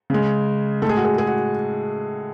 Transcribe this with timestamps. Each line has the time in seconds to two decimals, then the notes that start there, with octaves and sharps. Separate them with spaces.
0.10 C#3 G#3
0.82 A2 G#3 A4
0.89 G#4
0.97 F#4
1.04 G#4
1.18 G#4
1.27 F#4